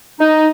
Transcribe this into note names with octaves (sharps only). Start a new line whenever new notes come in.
D#4